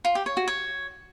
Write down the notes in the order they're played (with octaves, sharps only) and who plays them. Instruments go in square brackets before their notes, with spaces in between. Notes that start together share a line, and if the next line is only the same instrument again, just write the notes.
[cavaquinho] F4
G4
C#5
F#4
C#5